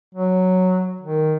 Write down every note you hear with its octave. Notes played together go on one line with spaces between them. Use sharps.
F#3
D#3